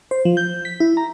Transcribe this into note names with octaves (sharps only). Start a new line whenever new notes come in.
C5
F3
G6
B6
E4
A#5